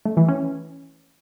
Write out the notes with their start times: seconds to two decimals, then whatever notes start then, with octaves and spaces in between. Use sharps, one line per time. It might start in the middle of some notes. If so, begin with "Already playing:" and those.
0.05 A3
0.17 E3
0.29 C#4